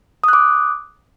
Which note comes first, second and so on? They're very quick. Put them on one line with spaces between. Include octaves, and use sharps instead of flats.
D#6 F#6 D6